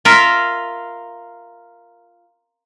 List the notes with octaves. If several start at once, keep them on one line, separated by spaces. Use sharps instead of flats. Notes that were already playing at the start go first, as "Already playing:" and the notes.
F4 A#4 E5